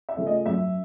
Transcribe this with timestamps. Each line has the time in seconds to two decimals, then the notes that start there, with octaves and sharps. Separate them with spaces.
0.09 E5
0.17 C#3 F3 A3
0.27 D#5
0.46 F#2 E5